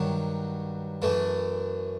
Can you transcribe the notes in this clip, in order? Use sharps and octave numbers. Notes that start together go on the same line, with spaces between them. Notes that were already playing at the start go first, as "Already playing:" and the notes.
Already playing: G2 D#3 F#3
F#2 E3 A3